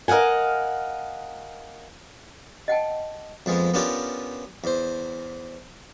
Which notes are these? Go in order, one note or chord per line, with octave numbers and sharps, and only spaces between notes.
A#4 D#5 F5 F#5 G#5
D#5 F#5 G5 A5
F2 F3 G#3 B3
B3 C#4 D4 F4 G4 A#4
E2 C5